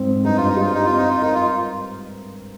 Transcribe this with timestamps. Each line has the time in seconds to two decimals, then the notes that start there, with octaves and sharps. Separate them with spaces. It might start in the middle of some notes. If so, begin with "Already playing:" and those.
Already playing: G#2 C4
0.25 G2 D#4
0.37 F4
0.49 D#4
0.57 G3 F4
0.74 D#4
0.86 C4 F4
0.97 D#4
1.10 F4
1.22 D#4 A#4
1.35 F4